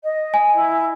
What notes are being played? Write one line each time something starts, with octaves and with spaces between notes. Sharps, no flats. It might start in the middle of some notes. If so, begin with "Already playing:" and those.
D#5
G#5
E4